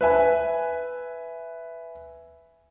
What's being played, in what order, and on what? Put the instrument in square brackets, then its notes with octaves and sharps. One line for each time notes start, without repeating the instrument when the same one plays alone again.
[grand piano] B4 E5 G#5